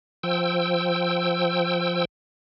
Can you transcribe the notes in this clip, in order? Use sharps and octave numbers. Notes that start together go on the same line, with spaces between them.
F3 G5 E6